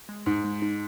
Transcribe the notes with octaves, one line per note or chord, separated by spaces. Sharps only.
G#3
G#2 D#4
G#3
D#4